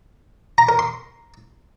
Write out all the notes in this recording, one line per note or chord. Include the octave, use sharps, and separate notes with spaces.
A#5
A#4
C6